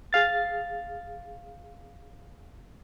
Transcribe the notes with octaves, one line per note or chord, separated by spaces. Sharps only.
G#4 F5 A6